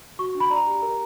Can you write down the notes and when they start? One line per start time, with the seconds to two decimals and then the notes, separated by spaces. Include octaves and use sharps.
0.19 F#4 C#6
0.35 D4
0.40 B5
0.50 D5 A#5
0.67 G4
0.82 A#4